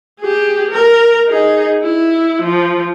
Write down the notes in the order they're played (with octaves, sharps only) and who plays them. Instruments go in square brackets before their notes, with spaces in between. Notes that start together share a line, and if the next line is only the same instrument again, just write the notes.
[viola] G4 G#4
A#4
D#4 G#4
E4
F3